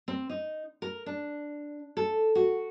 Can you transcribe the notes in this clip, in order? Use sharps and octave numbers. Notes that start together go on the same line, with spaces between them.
C4
D#4
A#4
D4
A4
F#4